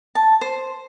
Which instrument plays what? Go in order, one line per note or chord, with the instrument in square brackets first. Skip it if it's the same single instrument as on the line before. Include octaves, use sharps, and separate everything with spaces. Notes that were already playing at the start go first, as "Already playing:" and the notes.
[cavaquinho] A5
C5